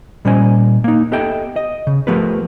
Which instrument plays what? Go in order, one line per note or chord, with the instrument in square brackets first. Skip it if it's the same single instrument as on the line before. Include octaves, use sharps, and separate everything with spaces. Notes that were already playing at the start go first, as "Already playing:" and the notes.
[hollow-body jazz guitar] A#2 G3 C#4 C5 D#5 G#5
A#3 D#4
B3 G4 A4 D#5 E5 G5
D#5
C#3
F3 A3 B3 G4 A#4 B4